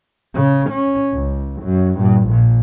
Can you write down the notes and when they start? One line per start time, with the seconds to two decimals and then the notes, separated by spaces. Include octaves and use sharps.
0.34 C#3
0.71 C#4
1.13 C#2
1.62 F#2
1.98 G2 A#2
2.28 A#1 A#2